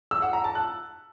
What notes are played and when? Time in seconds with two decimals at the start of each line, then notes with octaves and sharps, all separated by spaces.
0.11 E6
0.22 F#5
0.33 A#5
0.44 A5
0.55 F#6